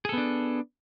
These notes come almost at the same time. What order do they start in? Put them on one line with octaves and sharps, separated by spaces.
G#4 A4 B3 D4